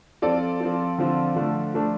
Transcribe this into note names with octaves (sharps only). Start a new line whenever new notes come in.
F3 C4 F4 A4 D5
F3 C4 F4
D3 F3 C4 F4
D3 F3 A3
F3 A3 D4